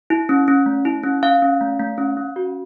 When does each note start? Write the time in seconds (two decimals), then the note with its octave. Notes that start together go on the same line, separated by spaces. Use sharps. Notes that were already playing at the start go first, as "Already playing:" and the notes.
0.10 E4
0.29 C#4
0.48 C#4
0.66 A3
0.85 E4
1.03 C#4
1.23 C#4 F5
1.42 C#4
1.61 A3
1.79 A3
1.98 C#4
2.17 C#4
2.36 F#4